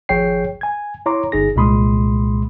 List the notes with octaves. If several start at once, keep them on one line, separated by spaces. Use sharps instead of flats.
G#1 F3 G#4 C#5 G5 C7
G#5 G#6
E4 C#5 A#5 C6 D6
G1 D#4 G#4 A#6
C2 A#2 G#3 B5 C6 D#6